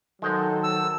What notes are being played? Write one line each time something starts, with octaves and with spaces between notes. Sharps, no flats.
D#3 F#3 G#3 A4 C5 D#5
E6